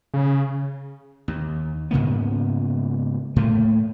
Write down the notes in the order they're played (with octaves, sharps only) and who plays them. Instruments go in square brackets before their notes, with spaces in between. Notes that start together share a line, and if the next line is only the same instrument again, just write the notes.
[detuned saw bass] C#3
[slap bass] D#2
G#2 C#3 A#3 B3
A2 A3 A#3